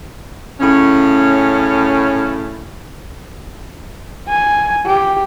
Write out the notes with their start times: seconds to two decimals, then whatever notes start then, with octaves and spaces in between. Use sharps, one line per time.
0.60 A2 C#3 C#4
4.29 G#5
4.86 G4